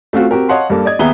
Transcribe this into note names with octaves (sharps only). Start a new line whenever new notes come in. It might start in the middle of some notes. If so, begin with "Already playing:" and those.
A3 C4 F4 F#4
C4 F#4 G4 A#4
C#5 D#5 F5 F#5 A5 C6
G2 A#3 A4
D5 D#5 G#6
D#2 B3 G#4 E5 A#5 G7